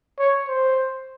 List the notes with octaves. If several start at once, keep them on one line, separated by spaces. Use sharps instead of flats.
C#5
C5